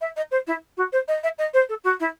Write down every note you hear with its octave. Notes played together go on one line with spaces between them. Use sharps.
E5
D#5
C5
E4
F#4
C5
D#5
E5
D#5
C5
A4
F#4
E4